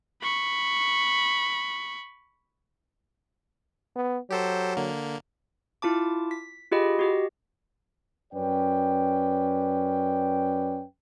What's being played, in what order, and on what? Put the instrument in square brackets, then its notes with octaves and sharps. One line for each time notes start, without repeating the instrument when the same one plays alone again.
[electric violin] B5 C#6
[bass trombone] B3
[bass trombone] F#3 [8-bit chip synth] G4 A4 C5
[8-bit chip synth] D3 A#3
[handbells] E4 F4 A5 D6
B6
F4 G4 G#4 D#5 B5
F#4 G4 D#5
[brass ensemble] F#2 C#4 B4 D5 G5